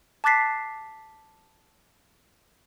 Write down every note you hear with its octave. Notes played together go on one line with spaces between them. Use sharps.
A5 D6 F#6 A6 B6 C7